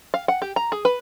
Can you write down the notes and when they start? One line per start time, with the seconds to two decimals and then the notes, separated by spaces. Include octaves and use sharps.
0.14 F5
0.28 F#5
0.42 G4
0.56 A#5
0.72 G#4
0.85 B4